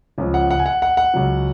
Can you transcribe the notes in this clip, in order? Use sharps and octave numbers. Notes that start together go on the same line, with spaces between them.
C#2 C#3 F3
F#5
F#5
G#5
F#5
F#5
F#5
C#2 C#3 F#3